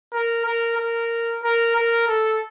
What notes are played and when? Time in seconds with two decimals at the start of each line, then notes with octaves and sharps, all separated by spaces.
0.13 A#4
0.46 A#4
0.78 A#4
1.44 A#4
1.76 A#4
2.08 A4